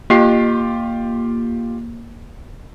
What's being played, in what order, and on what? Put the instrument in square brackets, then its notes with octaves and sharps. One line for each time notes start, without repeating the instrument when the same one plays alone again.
[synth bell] A#3 [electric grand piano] F4 G4 C7